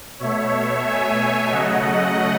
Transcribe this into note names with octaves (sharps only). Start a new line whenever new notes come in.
B2 A3 C#5 E5
E5 G#5
C#3 F#3 A3 D#5 F#5